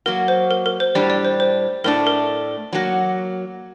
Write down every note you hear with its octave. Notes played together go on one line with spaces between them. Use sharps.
F#3 A#3 F#4 A#4
C5
A#4
A#4
C5
A2 G3 D4 G4 D5
D5
C5
C5
A2 A3 D4 A#4
A#4
F#3 A#3 F#4